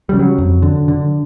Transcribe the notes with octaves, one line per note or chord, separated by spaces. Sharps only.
C#3 G3
F#3
F2
D3
D3